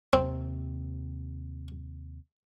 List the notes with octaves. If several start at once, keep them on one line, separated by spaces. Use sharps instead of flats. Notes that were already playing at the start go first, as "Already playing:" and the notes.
D#2 C3 C4